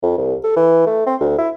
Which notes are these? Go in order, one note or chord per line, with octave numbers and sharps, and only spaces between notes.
F2
C2
A4
E3
A3
C4
D2
E4